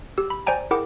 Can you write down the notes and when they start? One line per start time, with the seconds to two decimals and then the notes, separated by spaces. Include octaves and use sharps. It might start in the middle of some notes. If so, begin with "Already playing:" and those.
0.18 G4 E6
0.30 B5
0.47 C5 D5 G5 G#5 A#5
0.71 E4 G#4 A#4 F#5 G5 D6